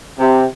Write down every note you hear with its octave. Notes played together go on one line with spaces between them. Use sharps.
C3